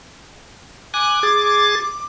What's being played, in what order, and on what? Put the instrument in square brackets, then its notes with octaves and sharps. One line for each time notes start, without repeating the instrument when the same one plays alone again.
[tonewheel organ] G#5 F#6 [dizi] D6
[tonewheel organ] G#4 A6